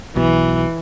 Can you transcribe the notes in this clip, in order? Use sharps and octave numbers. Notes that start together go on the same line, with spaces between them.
B1 B2 E3